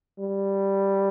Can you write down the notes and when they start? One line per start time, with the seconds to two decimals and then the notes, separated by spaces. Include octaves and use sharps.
0.20 G3